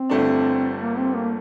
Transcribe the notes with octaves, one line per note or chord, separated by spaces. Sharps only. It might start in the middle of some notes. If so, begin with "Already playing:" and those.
Already playing: C4
G1 G2 D3 A3 D4
A#3
C4
A#3